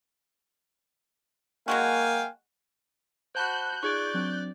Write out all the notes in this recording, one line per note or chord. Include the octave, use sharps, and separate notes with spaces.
F#3 G#3 A#3 F#4 F5 G5 G#5
F#4 C5 A5 B5 F#6 G6
D#4 F4 G#4 D5 C#6 G#6 D7
F#3 C4 D4